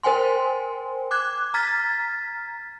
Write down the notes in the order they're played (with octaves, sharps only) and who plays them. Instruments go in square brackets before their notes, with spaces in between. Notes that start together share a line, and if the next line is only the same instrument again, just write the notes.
[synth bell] A#4 C5 G5 G#5 C6
D6 F#6 G#6
A#5 F6 G#6 A6 B6